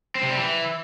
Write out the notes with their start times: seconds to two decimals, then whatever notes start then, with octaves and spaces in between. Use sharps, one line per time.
0.15 C4
0.23 C3
0.30 G3
0.38 E3